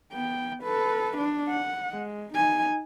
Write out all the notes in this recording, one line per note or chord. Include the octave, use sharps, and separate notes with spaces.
B3 G5
A4 B4
D4
F#5
G#3
D#4 G#5